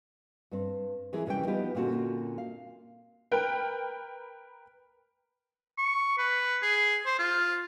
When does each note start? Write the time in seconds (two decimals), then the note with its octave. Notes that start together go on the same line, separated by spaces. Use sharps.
0.51 G2 C4
1.13 E3 C4 G#4 A#4
1.26 D#2 C3 E3 G3 C#4 G5
1.47 F3 G3 B3 D#4 G4 B4
1.75 A#2 D3 A#3 C4 C#4 F#4
2.38 F5
3.31 A#4 B4 G5
5.78 C#6
6.18 B4
6.63 G#4
7.06 C5
7.19 F4